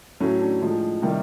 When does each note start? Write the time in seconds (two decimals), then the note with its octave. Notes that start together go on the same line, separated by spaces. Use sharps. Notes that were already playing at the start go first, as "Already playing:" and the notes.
0.20 A2 F#3 A3 C#4
0.41 D4
0.61 A2 F3 G#3
1.02 C3 D#3 G3 A#3